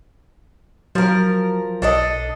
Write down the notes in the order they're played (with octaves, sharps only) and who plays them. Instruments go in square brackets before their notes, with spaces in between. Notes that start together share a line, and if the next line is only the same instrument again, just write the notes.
[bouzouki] F3 A#4 [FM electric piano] F#3
[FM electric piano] B1 [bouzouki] D4 A4 D#5